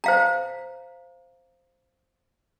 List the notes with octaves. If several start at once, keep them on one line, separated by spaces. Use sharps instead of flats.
C5 F5 A#5